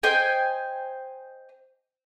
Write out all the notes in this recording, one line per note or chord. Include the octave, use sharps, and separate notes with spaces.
C5 D#5 G5 G#5